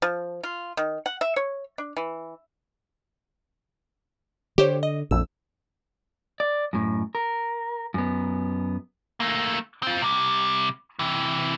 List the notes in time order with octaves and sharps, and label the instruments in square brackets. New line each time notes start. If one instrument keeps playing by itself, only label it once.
[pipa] F3
F4
D#3
F#5
E5
C#5
D4
E3
[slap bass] D3 [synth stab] G4 C5 C#5
[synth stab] D#5
[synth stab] A#1 E6 [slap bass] F2
[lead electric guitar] D5
F#2 A2
A#4
F#2 B3
A3 A#3
C4 F4
C3 G3
C3 E3